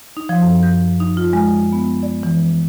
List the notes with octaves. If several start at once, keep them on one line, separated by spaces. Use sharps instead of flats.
D#4
F3
F#2
G6
D#4
F4
G#3
B3
D5
E3